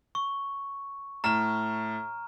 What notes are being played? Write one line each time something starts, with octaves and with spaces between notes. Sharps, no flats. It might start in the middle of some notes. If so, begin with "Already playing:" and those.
C#6
A2 A#5 F6 E7